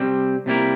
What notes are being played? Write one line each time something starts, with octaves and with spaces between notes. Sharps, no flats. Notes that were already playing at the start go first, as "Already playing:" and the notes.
Already playing: C3 G3 C4
C3 G3 A#3 E4 A#4